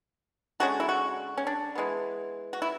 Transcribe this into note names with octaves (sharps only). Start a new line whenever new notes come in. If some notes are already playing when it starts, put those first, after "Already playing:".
D3 G#3 C#4 F#4
E4
F#4
C#4
D4
E3 G#3 B3
F#4
E4